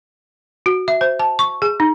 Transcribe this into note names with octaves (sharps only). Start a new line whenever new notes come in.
F#4
E5
C5
A5
C#6
G#4
D#4